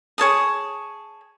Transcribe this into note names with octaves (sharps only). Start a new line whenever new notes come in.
G#4 C#5 A5 D#6